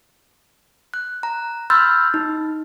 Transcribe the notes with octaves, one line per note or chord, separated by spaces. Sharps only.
F#6
A#5
B5 C6 E6 F6 G6 A6
D#4